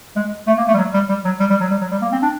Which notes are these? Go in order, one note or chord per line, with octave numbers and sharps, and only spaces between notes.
G#3
A3
A#3
A3
G3
F#3
G3
G3
F#3
G3
G3
F#3
G3
F#3
G3
A#3
C4
D4